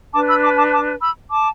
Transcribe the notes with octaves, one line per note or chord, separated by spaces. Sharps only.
D4 B4 A5 D6
B5 E6
A5 D6
A5 D6
A5 D6
B5 E6
A5 D6